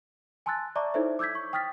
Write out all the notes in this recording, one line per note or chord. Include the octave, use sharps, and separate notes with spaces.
G#5 A5 C6 E6 F#6 A6
D5 E5 A5 A#5 C#6 D6
D#4 E4 A4 C5 C#5 E5
D6 E6 G6 G#6 B6
C#6
G5 D#6 F6 A6 B6